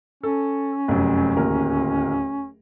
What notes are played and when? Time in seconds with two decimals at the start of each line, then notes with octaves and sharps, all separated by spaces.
0.23 C#4 A4
0.88 F1 F#2
1.36 D1 D#2 A#4